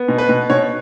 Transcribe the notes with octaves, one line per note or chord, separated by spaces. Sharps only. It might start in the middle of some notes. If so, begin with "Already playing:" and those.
Already playing: B3
B2
B4
B2
B2 C#5